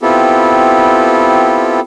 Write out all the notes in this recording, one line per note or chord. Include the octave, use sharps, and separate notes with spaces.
B3 C4 E4 F4 G4 A4